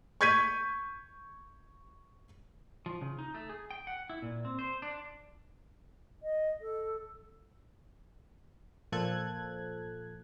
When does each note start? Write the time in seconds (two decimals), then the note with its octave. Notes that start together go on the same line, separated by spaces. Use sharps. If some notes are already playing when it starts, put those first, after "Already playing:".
0.21 C#6 G6 G#6 B6 D#7
2.86 F3
3.01 C#3
3.19 D#4
3.34 A3
3.49 G#4
3.71 G5
3.87 F#5
4.10 E4
4.22 A#2
4.45 C4
4.59 C5
4.82 D4
6.23 D#5
6.61 A4
8.92 A#2 F3 A4 F#6 G#6